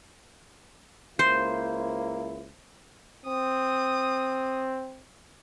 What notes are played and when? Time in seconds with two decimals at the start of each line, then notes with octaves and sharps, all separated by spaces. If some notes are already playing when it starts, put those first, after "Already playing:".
1.19 C#2 A#3 E4 C5
3.26 C4 D#6